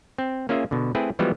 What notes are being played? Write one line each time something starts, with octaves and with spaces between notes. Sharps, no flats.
C4
A#3 C#4 F4 G#4 E5
B2 D3
A3 C4 E4 G#4 B4
E3 F3 G3 G#3 B3 F#4